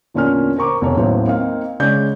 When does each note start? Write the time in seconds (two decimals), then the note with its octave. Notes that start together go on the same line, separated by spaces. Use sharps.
0.14 E2 A#2 D3 C#4 A#4 F6
0.56 A#4 C5 A#5 C#6 D6
0.81 F1 B2 C#5
0.96 A1 D#2 A2 F#3 B3 C5
1.27 A#3 C4 D#4 F5
1.80 C#3 G#3 C#5 D5 G6